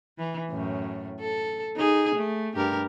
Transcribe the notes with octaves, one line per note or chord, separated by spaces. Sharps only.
E3
F#2 A2
A4
D#4 G#4
A3
G2 G4 A#4